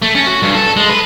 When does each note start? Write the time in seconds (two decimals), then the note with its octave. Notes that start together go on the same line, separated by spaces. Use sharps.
0.02 A3
0.15 C#4
0.27 F#4
0.42 G2
0.55 A4
0.76 G#3
0.89 B4